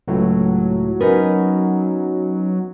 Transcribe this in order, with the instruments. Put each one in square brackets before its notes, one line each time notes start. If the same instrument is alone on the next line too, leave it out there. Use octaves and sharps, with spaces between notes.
[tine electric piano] C#2 A2 [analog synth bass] F#3
[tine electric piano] B3 C#4 D#4 [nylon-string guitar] A#4 B4